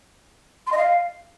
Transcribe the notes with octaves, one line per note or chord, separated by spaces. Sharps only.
C6
D#5
F5